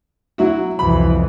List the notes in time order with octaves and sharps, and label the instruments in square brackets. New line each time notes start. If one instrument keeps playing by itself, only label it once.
[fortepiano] F#3 E4 F#4
[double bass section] C2 F2 E3 [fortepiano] B5